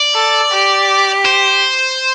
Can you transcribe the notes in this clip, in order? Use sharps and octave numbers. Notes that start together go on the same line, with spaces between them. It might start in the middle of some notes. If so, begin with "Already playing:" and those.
Already playing: D5
A4
G4
C5